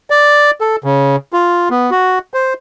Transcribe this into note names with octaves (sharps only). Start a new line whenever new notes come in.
D5
A4
C#3
F4
B3
F#4
C5